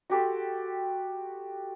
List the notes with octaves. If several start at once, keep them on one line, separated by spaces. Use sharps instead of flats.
F#4 G4 A4 C6